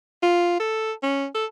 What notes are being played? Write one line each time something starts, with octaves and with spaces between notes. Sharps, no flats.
F4
A4
C#4
A4